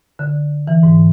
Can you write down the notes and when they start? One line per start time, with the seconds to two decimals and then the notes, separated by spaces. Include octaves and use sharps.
0.19 D3
0.68 E3
0.83 G#2